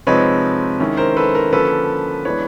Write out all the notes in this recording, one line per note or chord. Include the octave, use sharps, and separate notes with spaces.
C3 F3 G#3 C4 D#4 B4 C#5
D#3 G#3 C#4 E4
A#4 C5
A4 B4
A#4
D3 F3 A#3 C#4 A4 B4
E3 G#3 B3 D4 B4 C#5